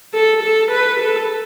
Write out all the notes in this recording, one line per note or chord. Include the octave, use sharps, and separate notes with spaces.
A4
A4
B4
A4